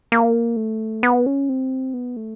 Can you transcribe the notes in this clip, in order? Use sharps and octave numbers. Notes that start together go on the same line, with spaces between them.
A#3
A3
B3
C#4
C4
B3
A3